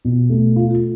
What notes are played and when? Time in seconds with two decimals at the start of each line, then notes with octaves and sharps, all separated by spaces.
0.05 B2
0.30 A3
0.56 F4